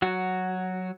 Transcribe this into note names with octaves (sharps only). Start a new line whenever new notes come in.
F#3 F#4